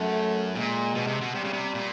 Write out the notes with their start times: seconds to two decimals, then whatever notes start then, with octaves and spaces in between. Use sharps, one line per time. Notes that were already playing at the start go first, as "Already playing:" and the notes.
Already playing: F#2 A3
0.55 A#2 G#3
0.95 B2
1.07 C3
1.21 B2
1.34 C3 G3
1.44 C#3
1.53 C3
1.74 A#2